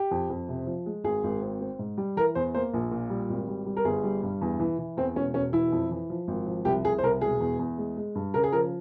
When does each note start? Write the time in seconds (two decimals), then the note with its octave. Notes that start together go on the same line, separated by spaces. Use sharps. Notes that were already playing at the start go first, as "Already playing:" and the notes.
Already playing: G4
0.11 F2
0.30 F2
0.49 C3
0.67 F3
0.86 G#3
1.04 G#1 G#4
1.24 G#1
1.42 C4
1.61 C4
1.79 G#2
1.98 G3
2.17 E3 A#4
2.35 E2 C5
2.54 A#3 C5
2.74 A#1
2.91 A#2
3.10 G3
3.29 G#1
3.48 G3
3.66 G3
3.77 A#4
3.85 G1 G#4
4.04 G3
4.23 G2
4.41 E2
4.60 E3
4.79 E3
4.97 E2 C4
5.15 E1 C#4
5.34 E1 C#4
5.53 E3 E4
5.72 F2
5.91 E3
6.10 F3
6.28 G#1
6.46 F3
6.65 C2 G4
6.85 C2 G#4
6.98 C5
7.03 C2 A#4
7.21 E1 G#4
7.40 E2
7.59 E2
7.78 G#3
7.97 G#3
8.15 G2
8.34 C#3 A#4
8.43 G#4
8.52 F3 A#4